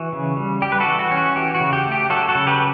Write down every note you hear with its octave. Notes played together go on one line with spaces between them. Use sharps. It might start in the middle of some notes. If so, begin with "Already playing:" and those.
Already playing: E3 F#4
C#3
G3
G3 G4
B4
F#4 A4
E3
F#4
C#4
F#4
E3 G4
F#4
C#3
G4
A3
G4
F#3 F#4 A4
F#4 A4
C#3
G4 B4